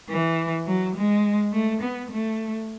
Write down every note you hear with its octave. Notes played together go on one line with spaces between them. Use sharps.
E3
F#3
G#3
A3
B3
A3